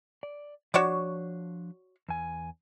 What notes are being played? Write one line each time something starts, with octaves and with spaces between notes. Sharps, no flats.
D5
F3 D4 F#4 C#5 D5
E2 G#5